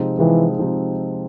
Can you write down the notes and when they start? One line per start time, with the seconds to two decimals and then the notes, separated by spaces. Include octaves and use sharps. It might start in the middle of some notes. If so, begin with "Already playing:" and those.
Already playing: C3 F3 G#3 C4 D#4
0.19 C3 E3 F3 G#3 C4 D#4
0.59 C3 F3 G#3 C4 D#4